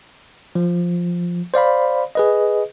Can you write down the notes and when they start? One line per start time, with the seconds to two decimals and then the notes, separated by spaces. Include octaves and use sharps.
0.55 F3
1.54 C5 D5 F5 B5
2.15 G#4 B4 D#5